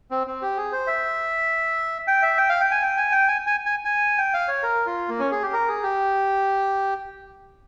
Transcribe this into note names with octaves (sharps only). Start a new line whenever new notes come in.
C4
C4
G4
G#4
C5
E5
G5
E5
G5
F5
G5
G#5
G5
G#5
G5
G#5
G#5
G#5
G#5
G5
F5
C#5
A#4
F4
A#3
C#4
G#4
G4
A#4
G#4
G4